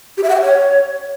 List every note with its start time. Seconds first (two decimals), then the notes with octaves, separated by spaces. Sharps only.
0.17 G4
0.23 E5
0.29 F#5
0.35 G5
0.41 C#5